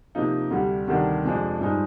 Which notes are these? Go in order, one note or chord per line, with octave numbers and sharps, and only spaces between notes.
C3 F3 A#3 D#4
D2 C3 G3
D2 C3 D#3 G3 D4
F2 C3 F3 G#3 D4
G2 F3 G#3 D#4